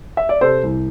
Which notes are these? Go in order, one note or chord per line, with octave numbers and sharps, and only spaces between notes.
E5
D5
C3 A4 C5
C2